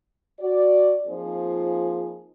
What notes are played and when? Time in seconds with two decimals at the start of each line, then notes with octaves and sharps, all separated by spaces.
0.40 F#4 D5
1.08 F3 A#3 C4 D#4 F4 G#4